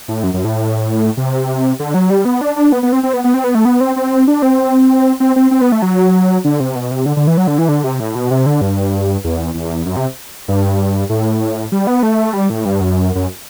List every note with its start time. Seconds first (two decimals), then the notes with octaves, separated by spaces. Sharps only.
0.08 A2
0.24 F#2
0.34 F#2
0.44 A2
1.17 C3
1.80 D3
1.94 F#3
2.10 G3
2.25 B3
2.41 D4
2.56 D4
2.72 B3
2.83 B3
2.92 C4
3.03 C4
3.13 B3
3.24 B3
3.34 C4
3.44 B3
3.55 A3
3.65 B3
3.81 C4
3.96 C4
4.28 D4
4.42 C4
5.20 C4
5.36 C4
5.51 C4
5.61 B3
5.72 A3
5.82 F#3
6.44 D3
6.60 C3
6.75 B2
6.91 C3
7.06 D3
7.17 D3
7.27 E3
7.37 F#3
7.47 D3
7.58 E3
7.69 D3
7.84 C3
8.00 A2
8.15 B2
8.31 C3
8.46 D3
8.61 G2
9.24 E2
9.54 E2
9.86 F#2
9.97 C3
10.48 G2
11.09 A2
11.72 G3
11.87 B3
12.03 A3
12.33 G3
12.50 A2
12.65 G2
12.81 F#2
13.15 F#2